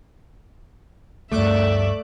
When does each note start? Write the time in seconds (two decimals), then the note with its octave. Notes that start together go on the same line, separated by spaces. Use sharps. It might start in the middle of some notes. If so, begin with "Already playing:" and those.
1.31 D2 G2 A3 D5 E5 D6 F#6